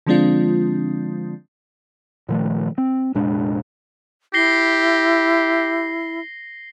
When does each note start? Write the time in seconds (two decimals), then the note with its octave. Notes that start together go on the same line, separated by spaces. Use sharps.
0.06 D3 F3 G#3 C4 D4 F4
2.29 A#2 D#3 F3 A3
2.78 C4
3.15 F1 A#2 G#3 D4
4.34 E4 G4 A#6 C7 G7